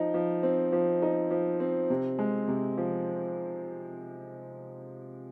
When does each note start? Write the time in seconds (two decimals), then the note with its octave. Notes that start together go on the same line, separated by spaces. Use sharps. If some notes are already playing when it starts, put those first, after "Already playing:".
Already playing: F3 D#4
0.14 F3
0.43 C4
0.72 F3
1.02 D#4
1.31 F3
1.60 C4
1.90 C3
2.19 G#3
2.48 C3
2.78 F3